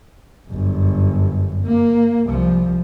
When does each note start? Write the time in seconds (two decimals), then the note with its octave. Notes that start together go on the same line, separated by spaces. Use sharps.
0.47 G1 F#2
1.63 A#3
2.26 C2 F3